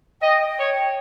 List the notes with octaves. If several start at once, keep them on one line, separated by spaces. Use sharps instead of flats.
D#5 G5
C#5